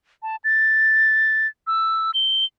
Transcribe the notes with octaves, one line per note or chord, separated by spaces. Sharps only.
A5
A6
E6
G7